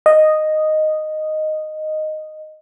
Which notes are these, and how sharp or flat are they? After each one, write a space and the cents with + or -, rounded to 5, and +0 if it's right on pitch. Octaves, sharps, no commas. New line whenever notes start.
D#5 -5